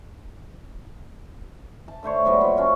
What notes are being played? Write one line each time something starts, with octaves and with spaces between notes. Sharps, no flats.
A5
D3 A3 C5 C#5
G#2 F#3 G3 B3
A#2 E5
B2 F3 C#4 F#4